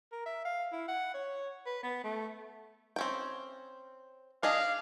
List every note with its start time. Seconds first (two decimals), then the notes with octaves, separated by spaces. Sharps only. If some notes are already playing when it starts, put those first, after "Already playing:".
0.12 A#4
0.26 E5
0.45 F5
0.72 E4
0.88 F#5
1.14 C#5
1.66 B4
1.83 B3
2.04 A3
2.96 C4 C#4 G5
4.43 D4 G#4 D#5 F5